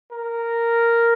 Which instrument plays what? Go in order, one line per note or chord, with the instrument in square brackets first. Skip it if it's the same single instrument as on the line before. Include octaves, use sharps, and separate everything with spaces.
[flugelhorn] A#4